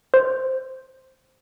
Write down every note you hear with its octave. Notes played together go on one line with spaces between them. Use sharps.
C5